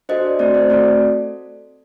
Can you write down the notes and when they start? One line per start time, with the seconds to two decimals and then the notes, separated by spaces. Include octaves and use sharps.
0.09 D4 F#4 A4 C5 D#5
0.25 D5
0.39 A3 C4 F#4 A4 D5
0.54 C5
0.70 A3 C4 F#4 A4 D5